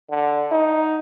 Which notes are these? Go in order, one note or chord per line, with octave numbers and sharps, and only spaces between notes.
D3
D#4